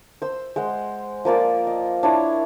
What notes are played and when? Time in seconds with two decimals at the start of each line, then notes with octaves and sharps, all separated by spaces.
0.22 C5 E6
0.56 G#3 C5 F#5
1.25 F3 A#3 F4 D5
1.67 D#5
2.03 D4 E4 C#5